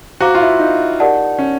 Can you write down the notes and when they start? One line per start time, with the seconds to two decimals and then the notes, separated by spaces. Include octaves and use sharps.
0.20 F#4 C5 F5 A#5 D6
0.35 F4
0.40 E4
0.59 D#4
1.00 G4 A#4 D5 F#5 A5
1.38 C#4